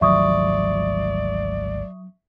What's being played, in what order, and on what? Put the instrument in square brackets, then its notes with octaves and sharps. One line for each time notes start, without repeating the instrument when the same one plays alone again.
[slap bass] G#1 D2 F3 [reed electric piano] F#3 [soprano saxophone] D5 [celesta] E5 C#6 D#6